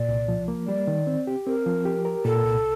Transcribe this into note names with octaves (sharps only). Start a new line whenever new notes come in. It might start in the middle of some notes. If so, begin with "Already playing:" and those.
Already playing: A#2 D5
C2
F3
A#3
G3 D5
D#3
C4
G4
C4 A#4
F3
G4
A#4
A#2 A4
C2